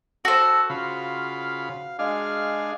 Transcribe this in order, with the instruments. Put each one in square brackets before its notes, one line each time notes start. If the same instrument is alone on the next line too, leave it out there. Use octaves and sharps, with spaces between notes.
[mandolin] F#4 C5 [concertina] A4
[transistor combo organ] C#3 F4 B5 [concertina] F5
[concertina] G#3 F5 F6 [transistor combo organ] D4 G#4